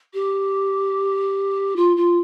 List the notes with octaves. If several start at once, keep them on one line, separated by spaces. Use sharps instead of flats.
G4
F4
F4